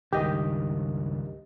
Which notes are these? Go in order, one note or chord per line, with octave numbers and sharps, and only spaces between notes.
C#2 G2 D#3 G4 D#5